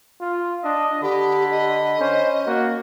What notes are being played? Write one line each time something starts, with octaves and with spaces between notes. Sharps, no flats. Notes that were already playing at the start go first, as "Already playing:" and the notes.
F4
D4 D#5
D3 G4 B5
D#5
C#4 C5
A#3 F#4